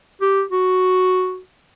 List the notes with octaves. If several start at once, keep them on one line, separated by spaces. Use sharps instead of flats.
G4
F#4